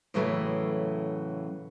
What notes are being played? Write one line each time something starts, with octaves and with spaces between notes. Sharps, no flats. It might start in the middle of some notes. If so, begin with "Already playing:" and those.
A2 C#3 E3 F#3 A3